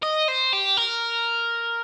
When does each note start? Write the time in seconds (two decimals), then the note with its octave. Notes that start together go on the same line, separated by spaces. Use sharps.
0.03 D#5
0.28 C5
0.53 G4
0.77 A#4